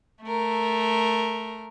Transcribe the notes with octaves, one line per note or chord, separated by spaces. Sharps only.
A3 A#4